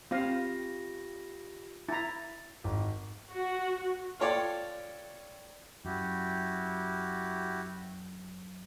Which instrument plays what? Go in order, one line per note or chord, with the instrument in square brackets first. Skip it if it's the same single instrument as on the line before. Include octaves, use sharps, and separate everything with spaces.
[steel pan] C4 F5 [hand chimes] F4 G4 A#6
[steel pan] E4 A#5 [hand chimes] A6
[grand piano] G#1
[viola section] F#4
[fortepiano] F4 A4 C#5 D5 G5
[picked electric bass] F#2 [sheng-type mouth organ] E4 F#4 G4